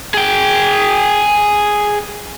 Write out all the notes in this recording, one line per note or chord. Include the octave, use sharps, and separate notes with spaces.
G#4 G5